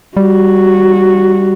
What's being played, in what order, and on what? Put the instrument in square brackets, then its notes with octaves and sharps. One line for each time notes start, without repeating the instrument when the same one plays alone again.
[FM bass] G3 [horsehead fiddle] F#4